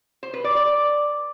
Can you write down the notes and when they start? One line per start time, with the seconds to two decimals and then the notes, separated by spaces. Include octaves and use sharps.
0.23 C5
0.34 B4
0.44 D5
0.55 D5